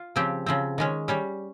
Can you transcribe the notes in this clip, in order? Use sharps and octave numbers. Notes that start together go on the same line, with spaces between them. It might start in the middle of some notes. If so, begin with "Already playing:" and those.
Already playing: F4
C#3 F3 C4 G4
C#3 F3 C4
D#3 G#3 C#4
G3 C#4 G4